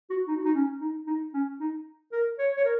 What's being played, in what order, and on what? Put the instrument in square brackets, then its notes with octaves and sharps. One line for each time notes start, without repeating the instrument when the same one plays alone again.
[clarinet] F#4
D#4
F#4
D#4
C#4
D#4
D#4
C#4
D#4
A#4
C#5
C#5
A#4